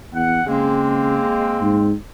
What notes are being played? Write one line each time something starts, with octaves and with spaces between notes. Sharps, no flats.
E2 F#5
C#3 G#3 A#3 C4
G#2